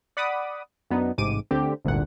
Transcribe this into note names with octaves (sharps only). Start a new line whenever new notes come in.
D5 F#5 B5 D6 D#6
F#2 B3 D4 D#4
A1 G#2 C3 D6 D#7
D2 D3 C4 G4
G#1 D2 G2 A#2 F#5